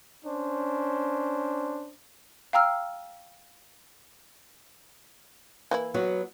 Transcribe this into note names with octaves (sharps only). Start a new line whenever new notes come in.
C#4 D4 C5
F5 G5 A#5 E6 F6
E3 A#3 E4
F#3 B3 F#4